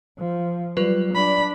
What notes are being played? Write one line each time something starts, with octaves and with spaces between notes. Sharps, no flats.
F3
F#3 G3 F4 B4
D4 B5